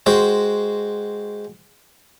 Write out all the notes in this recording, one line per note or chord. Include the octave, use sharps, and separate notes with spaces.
G#3 F#4 C5 G5